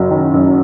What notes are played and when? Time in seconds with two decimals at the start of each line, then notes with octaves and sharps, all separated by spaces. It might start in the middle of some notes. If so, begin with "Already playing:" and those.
Already playing: F#1 F#3
0.11 D#3
0.34 F#2